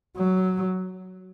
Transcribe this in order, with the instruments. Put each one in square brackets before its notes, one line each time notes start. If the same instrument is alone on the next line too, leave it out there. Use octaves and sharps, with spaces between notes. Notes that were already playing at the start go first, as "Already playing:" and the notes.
[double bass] F#3